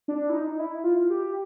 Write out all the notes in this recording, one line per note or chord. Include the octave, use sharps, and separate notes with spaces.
D4
E4
D#4
D#4
E4
F4
G4